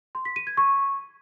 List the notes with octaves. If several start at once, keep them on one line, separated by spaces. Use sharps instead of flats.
C6
B6
D#7
G#6
C#6